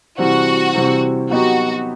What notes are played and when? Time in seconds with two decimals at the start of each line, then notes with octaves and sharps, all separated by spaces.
0.18 C3 E3 G3 C4 F#4
0.74 C3 E3 G3 C4
1.30 F#3 B3 D#4 F#4 G4